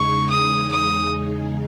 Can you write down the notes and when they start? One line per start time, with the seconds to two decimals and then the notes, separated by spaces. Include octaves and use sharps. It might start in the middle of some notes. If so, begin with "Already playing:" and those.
Already playing: E2 C#3 G#3 D#4 G#4 C#6
0.30 D#6
0.72 D#6